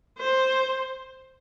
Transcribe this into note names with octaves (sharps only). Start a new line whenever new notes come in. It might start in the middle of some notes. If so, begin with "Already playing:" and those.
C5